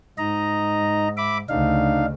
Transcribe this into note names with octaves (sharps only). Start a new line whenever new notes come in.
G#2 D#4 D#5 A#5
E5 B5 D6
D2 C#3 D4 D#4 F5